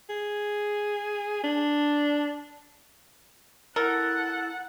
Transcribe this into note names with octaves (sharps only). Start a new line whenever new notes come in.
G#4
D4
E4 A4 A#4 F#5